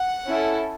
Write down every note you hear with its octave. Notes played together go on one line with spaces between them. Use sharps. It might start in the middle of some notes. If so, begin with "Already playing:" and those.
Already playing: F#5
C#4 E4 A4